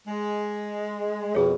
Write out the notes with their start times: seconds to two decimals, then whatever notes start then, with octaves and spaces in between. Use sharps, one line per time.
0.07 G#3
1.35 F2 B2 G#4 C#5